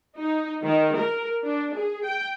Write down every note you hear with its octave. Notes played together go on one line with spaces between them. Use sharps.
D#4
D#3
A#4
D4
G#4
G5